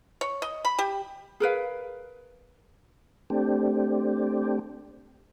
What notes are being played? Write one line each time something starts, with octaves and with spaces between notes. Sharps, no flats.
C#5
D#5
B5
G4
G#4 A#4 B4 F5
A3 C4 D4 G4